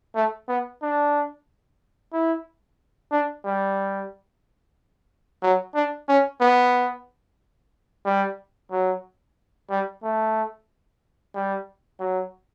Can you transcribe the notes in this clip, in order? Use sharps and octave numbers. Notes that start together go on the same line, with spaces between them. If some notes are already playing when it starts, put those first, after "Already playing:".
A3
B3
D4
E4
D4
G3
F#3
D4
C#4
B3
G3
F#3
G3
A3
G3
F#3